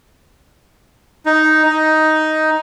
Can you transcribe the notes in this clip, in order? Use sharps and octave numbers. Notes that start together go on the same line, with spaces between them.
D#4
D#4